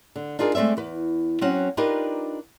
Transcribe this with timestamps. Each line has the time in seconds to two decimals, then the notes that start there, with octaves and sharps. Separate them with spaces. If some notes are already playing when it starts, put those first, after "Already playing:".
0.16 D3
0.39 D4 D#4 F4 G#4 A#4
0.55 G#3 A3 C4 D5 E5
0.77 E2 B4
1.41 F#3 C4 C#4 F#5
1.77 D4 D#4 F4 G4 A#4 B4